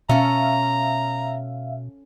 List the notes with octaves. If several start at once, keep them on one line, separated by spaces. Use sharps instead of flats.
B2 C#4 A4 E5 F5 A#5